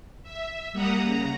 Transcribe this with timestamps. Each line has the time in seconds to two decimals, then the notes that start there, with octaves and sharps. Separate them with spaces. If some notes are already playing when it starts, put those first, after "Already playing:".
0.23 E5
0.73 G3 A#3 F#5 A#5 D#6
1.03 C#3 A#5